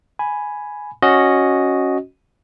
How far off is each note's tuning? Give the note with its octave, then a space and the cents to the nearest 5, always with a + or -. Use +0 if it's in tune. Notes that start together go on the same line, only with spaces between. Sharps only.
G#5 +5 B5 +0
C#4 -5 F#4 +0 D#5 +0